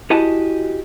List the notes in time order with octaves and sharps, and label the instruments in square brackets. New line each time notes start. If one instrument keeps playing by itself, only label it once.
[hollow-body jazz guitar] E4 F#4 G4 D#5 G#5 A5